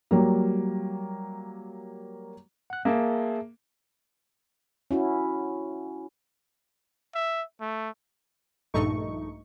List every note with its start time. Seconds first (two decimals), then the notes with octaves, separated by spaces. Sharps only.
0.11 F#3 G3 A#3
2.70 F#5 F#6
2.85 A#3 G#4 E5 A5
4.91 C#4 E4 F#4
7.15 E5
7.60 A3
8.74 A#1 G2 A3 D#4 C#6